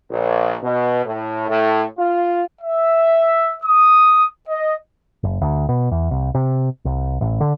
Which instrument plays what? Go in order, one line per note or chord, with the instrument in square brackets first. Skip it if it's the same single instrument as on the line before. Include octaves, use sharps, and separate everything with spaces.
[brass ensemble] A#1
B2
A2
A2
F4
[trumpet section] E5
D#6
D#5
[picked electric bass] F#1
D2
B2
E2
C2
C3
C2
A1
D3